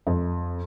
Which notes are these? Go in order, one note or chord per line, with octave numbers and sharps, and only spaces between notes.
F2